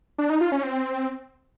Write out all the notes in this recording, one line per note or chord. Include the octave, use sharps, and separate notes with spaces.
D4
D#4
F4
C#4
C4